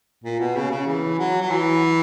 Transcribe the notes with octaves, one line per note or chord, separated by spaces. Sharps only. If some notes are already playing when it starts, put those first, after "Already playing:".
A#2
B2
C#3
C#3
E3
F#3
F#3
E3